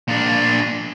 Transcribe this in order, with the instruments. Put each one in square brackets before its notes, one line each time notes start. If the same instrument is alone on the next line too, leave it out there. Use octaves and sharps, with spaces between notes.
[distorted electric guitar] A#2 D4